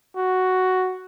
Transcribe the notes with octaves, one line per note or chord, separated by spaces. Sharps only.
F#4